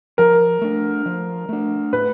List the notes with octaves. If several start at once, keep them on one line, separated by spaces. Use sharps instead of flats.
F3 A#4
A3 D4
F3
A3 D4
A2 B4